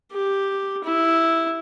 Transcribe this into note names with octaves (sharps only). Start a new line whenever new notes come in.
G4
E4